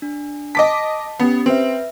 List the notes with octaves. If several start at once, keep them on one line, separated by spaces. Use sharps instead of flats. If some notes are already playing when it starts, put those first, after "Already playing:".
D4
D#5 A5 D6 B6
B3 C#4 G4
C4 B4 E5